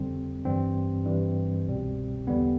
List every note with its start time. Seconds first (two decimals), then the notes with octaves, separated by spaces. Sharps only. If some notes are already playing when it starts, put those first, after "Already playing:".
Already playing: F2 D3 G3 C4
0.45 G2 E3 G3 C4
1.05 G2 E3 G3
1.66 C2 B2 G3
2.27 E2 D3 G3 B3